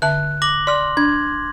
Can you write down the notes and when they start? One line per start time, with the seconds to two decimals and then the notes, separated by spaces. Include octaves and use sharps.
0.02 D3 E5 A5 F#6
0.42 D6 A#6 F#7
0.67 D5 C6 F6
0.97 D4 G#6